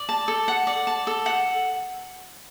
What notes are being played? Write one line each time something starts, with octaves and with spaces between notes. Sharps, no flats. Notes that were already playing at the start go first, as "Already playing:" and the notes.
Already playing: D5
A5
A4
F#5
D5
A5
A4
F#5